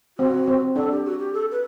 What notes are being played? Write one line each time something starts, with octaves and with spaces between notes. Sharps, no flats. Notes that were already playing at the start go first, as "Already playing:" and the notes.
C4 F#4
C4
D4 A4
G4
F#4
G4
A4
B4